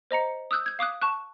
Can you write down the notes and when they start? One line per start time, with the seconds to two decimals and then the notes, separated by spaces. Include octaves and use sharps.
0.11 C5 D#5 A#5 C#7
0.51 D#6 E6 F#6 G6
0.66 G6 G#6
0.79 F5 D6 D#6 F#6
1.02 A5 C#6 F#6